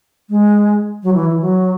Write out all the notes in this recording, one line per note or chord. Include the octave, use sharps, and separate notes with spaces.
G#3
F#3
E3
E3
F#3